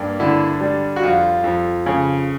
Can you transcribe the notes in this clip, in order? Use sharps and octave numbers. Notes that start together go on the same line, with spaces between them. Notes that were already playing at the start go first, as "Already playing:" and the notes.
Already playing: G2 A#3
D3 E4
G3
F#4
F2 F4
F2
C#3